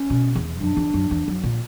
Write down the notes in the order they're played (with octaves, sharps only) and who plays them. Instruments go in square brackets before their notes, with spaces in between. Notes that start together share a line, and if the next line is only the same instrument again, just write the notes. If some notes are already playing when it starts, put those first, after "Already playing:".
Already playing: [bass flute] C#4
[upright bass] B2
E2
[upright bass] F#2 [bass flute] D4
[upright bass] E2
F#2
E2
F#2
A#2